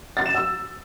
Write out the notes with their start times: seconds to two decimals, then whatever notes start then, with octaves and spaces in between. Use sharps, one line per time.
0.17 A6
0.26 E7
0.35 E6